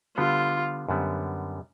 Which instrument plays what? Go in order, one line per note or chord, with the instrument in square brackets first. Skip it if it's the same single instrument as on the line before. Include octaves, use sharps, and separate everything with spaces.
[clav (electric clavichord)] D3 G3 B3 [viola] F4
[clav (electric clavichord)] F#2 D3 G3 B3